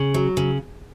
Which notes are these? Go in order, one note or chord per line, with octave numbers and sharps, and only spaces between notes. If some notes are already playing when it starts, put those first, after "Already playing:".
Already playing: C#3
F#3
C#3